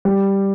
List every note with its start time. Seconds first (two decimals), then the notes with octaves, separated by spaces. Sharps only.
0.05 G3